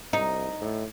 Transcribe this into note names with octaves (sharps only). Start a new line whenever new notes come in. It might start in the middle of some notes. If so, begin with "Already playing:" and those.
C2 D#4
A2